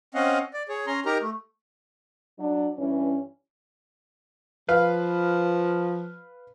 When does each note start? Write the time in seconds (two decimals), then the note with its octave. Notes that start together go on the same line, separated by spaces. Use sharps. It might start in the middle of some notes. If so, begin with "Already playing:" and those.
0.14 C4 C#4 D#5 F5 F#5
0.54 D5
0.69 G#4 C#5
0.87 C#4 A#5 C6
1.05 D#4 G4 A#4 A#5
1.21 A3
2.39 F#3 D4
2.79 G2 E3 C#4
4.69 F3 B4 F5